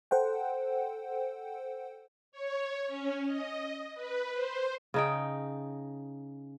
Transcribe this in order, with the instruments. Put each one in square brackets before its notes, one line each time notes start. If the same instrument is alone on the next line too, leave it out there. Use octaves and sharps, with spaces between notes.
[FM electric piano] A4 C5 F#5 G5
[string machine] C#5
C#4
D#5
B4
C5
[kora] C#3 D#4 G5